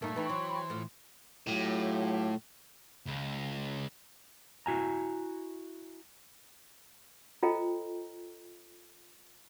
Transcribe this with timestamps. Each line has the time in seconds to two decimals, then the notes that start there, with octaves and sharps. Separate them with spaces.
0.02 G2 A#2 A3 A#3 D#4
0.16 E3 B3 D#4 G5 B5 C#6
0.29 F#3 C5
0.70 A2 F3
1.48 A2 F#3 F4 G4
3.06 C#2
4.66 E4 F#4 G#5 A#5
7.43 F4 A4 C5 D#5 G5 A#5